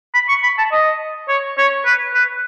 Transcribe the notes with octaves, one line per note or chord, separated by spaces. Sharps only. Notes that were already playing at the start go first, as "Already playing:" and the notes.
B5
C#6
B5
A5
D#5
C#5
C#5
B4
B4